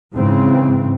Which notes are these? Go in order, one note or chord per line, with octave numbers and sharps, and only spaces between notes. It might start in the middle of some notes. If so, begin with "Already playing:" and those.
G#2 C#3 E3 C4